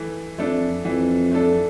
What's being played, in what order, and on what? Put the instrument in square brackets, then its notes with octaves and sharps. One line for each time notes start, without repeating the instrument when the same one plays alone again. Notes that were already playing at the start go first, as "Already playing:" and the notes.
Already playing: [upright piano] E3 A3
[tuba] F2 [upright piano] A3 D4 A4
[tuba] F2 [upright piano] E3
[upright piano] A3 D4 A4